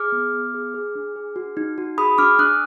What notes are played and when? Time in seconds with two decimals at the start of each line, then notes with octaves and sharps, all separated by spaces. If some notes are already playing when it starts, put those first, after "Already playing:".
Already playing: G#4 D6 F6
0.12 B3
0.34 B3
0.54 G#4
0.74 G#4
0.95 D4
1.16 G#4
1.36 F#4
1.57 D#4
1.78 F#4
1.98 G#4 B5 D#6
2.18 D4 D6 F6
2.39 D4 D#6 F#6